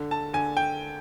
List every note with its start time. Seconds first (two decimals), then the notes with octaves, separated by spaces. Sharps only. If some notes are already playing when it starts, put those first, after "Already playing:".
Already playing: D3
0.11 A5
0.34 D3 G#5
0.57 G5